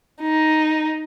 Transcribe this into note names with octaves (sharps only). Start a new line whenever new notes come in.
D#4